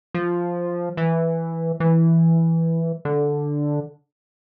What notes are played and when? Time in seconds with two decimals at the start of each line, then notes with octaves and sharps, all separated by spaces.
0.14 F3
0.97 E3
1.80 E3
3.05 D3